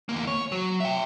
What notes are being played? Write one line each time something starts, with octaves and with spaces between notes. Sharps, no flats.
E2 A#3
C#5
F#3
E5 G5